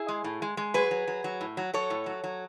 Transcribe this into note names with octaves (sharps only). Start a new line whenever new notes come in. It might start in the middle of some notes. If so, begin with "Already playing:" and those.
Already playing: E4 G#4
G#3
A2
G#3
G#3
F#3 G#4 B4
F#3
F#3
F#3
A2
F#3
F#3 A4 C#5
A2
F#3
F#3